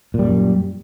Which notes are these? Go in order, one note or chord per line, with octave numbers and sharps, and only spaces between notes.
F#2 A#2 G3